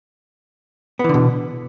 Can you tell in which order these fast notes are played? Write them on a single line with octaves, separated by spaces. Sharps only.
B3 E3 D3 B2